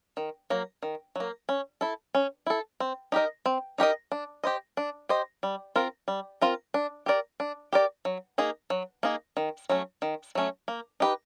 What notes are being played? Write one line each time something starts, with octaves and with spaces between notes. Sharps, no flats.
D#3
F#3 A#3
D#3
F#3 A#3
C#4
E4 A4
C#4
E4 A4
C4
D#4 G4 A#4 D#5
C4
D#4 G4 A#4 D#5
D4
G4 C5 D#5
D4
G4 C5 D#5
G3
C4 F4 A#4
G3
C4 F4 A#4
D4
G4 A#4 D5
D4
G4 A#4 D5
F#3
A#3 D#4 G#4
F#3
A#3 D#4 G#4
D#3
F#3 A3 C#4
D#3
F#3 A3 C#4
A#3
D#4 G4 B4